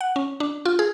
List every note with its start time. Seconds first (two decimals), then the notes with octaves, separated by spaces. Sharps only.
0.01 F#5
0.16 C#4
0.40 D4
0.65 F4
0.79 G#4